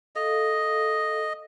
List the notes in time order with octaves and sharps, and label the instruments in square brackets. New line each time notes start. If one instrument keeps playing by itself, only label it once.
[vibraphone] A4 F5 [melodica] D#5